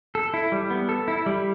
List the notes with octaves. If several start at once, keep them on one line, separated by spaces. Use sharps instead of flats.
A4
E4
G3
B3
A4
E4
G3